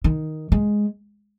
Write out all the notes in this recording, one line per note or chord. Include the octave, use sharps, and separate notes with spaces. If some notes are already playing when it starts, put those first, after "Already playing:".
D#3
G#3